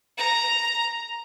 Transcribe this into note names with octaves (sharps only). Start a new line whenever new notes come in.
A#5